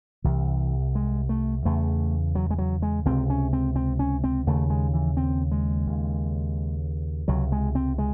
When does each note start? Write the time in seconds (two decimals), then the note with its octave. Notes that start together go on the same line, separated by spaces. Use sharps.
0.24 C2 C3 E3
0.95 G#3
1.29 A3
1.65 E2 C#3 A3
2.35 F#3
2.50 G#3
2.58 F#3
2.82 G#3
3.05 C#2 C3 C4
3.30 C#4
3.53 C4
3.76 C4
3.99 C#4
4.24 C4
4.47 D#2 C#3 A3
4.70 G#3
4.94 E3
5.17 C4
5.51 G#3
5.87 D#2 C#3
7.28 C#2 C3 F#3
7.52 G#3
7.75 C4
7.98 G#3